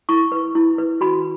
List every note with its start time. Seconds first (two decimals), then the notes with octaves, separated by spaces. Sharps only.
0.09 E4 C#6
0.32 B4
0.55 E4
0.78 B4
1.01 F#4 B5